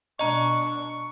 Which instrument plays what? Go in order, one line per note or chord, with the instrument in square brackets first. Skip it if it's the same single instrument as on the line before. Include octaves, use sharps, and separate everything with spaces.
[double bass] B2 D4 [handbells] D#5 A#5 [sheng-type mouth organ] C#6